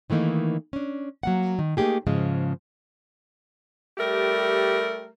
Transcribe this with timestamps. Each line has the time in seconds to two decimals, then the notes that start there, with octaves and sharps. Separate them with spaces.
0.10 D#3 E3 A3 A#3 D#4
0.73 C#4 D4
1.23 F#3 A#3 F#5
1.59 D#3
1.77 A3 A#3 C4 D#4 G4 G#4
2.07 G#2 C#3 F3 G#3
3.97 G3 A3 G4 A#4